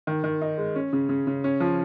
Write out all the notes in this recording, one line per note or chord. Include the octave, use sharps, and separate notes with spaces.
D#3
D#3
D#4
G#3
C#4
C#3
C#3
C#3
C#4
F3